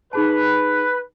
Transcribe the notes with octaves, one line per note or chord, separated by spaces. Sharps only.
D#4 G#4 B4 A5